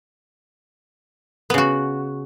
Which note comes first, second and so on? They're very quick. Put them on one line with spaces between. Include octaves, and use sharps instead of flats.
B3 C#3 F#4